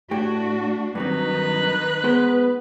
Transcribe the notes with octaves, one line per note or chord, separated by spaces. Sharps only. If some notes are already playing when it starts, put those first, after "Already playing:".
A2 A3 D4 F#4 G4
G2 D#3 F#3 C4 D#4 B4
G#3 B3 C5